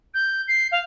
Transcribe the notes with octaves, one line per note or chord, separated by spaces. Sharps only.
G6
C7
F5